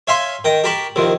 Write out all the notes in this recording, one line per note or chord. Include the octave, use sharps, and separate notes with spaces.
C#5 E5 F5 G#5 C6 C#6
D#3 G5 A#5
G4 A#4 A5 B5 C#6
C2 D#3 F3